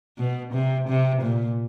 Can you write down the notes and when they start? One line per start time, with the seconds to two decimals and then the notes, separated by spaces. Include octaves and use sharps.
0.18 B2
0.53 C3
0.88 C3
1.22 A#2